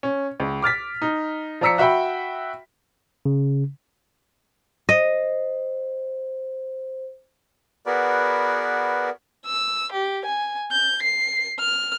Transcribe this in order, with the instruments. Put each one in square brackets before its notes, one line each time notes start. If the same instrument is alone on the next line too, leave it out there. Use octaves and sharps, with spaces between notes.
[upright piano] C#4
C#2
D6 F6 A6 B6
D#4
F3 D5 A#5 E6 B6 C#7
F#4 E5 F#5 G5 B5
[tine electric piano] C#3
[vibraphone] C5 [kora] D#5
[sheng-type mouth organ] B3 F#4 G#4 A#4 B4 D5
[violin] E6
G4
G#5
G6
C7
F6